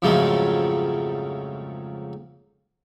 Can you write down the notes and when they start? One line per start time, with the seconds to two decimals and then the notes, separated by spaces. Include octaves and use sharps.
0.02 F2 G#2 C#3 F3 F#3 A3